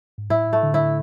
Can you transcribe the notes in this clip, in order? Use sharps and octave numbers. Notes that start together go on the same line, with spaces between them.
G#2
A2 E4
A3
D3
E4